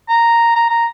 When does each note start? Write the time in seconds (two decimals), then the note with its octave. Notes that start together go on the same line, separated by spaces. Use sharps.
0.09 A#5
0.56 A#5
0.70 A#5